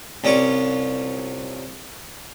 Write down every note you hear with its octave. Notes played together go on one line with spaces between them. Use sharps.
C2 C#4 F4 D5 C#6 D6